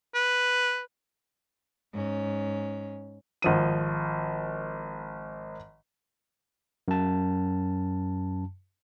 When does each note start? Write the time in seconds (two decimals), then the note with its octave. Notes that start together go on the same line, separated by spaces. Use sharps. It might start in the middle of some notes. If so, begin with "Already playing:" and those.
0.15 B4
1.91 G#2 C#4
3.42 G#1 F3 D#7
6.88 F#2 A5